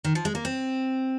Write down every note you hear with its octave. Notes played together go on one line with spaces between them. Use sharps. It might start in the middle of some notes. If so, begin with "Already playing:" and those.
D#3
F3
G#3
A#3
C4